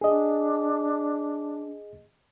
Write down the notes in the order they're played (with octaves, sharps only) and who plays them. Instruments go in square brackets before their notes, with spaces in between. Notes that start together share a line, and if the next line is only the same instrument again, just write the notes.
[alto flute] D4 [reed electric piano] G#4 D#5